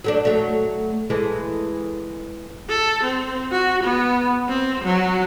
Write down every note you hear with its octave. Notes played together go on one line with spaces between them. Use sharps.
F#3 A3 D4
F#3 A3
E3 G#3 A3
A4
C4
F#4
B3
C4
F#3